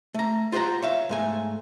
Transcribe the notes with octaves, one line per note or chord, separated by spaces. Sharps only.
A3 A#5
F4 G4 C5 F#5 A#5
C#5 E5 F5
G#2 A3 G#5